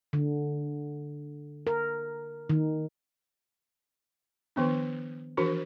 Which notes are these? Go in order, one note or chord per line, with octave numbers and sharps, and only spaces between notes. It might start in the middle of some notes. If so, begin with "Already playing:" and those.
D3
A#4
D#3
D#3 F3 B3 D4
E3 F3 D4 F#4 A#4